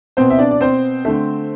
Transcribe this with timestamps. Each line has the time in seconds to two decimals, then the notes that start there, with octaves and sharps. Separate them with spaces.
0.17 B2 B3 C4 C5
0.30 E5
0.39 D4 D5
0.51 D5
0.61 C4 C5
1.05 D3 A3